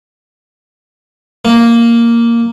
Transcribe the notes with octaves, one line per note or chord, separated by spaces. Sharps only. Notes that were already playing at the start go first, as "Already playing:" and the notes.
A#3